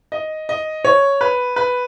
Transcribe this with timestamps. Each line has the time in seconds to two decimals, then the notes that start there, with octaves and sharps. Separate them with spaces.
0.12 D#5
0.49 D#5
0.85 C#5
1.21 B4
1.56 B4